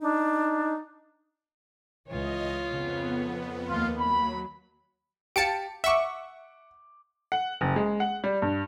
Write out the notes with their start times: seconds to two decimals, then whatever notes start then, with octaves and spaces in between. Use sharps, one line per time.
0.01 D4 D#4
2.08 C#2 E3 F4 C#5 D#5
2.69 F2 C#3 B3
3.68 D#2 A#3 F4
3.98 F#3 B5
5.36 G4 F5 A5 C#7 D7
5.84 E5 F#5 C#6 D6
7.32 F#5
7.61 F#1
7.76 G#3
8.00 F#5
8.24 G3
8.42 G2